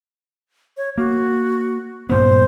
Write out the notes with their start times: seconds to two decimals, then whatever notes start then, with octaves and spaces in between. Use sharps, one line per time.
0.77 C#5
0.98 A#3 F#4
2.09 G2 A#2 B3 C5